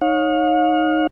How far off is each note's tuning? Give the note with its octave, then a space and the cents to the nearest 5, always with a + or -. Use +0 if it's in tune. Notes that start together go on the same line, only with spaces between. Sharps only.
D#4 +0 C#5 -10 F5 +40